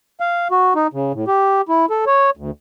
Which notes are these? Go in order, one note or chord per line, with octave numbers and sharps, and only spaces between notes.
F5
F#4
D#4
C#3
A2
G4
E4
A4
C#5
D2